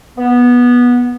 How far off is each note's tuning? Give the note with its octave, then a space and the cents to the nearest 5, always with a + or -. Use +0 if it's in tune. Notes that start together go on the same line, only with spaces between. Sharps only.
B3 -15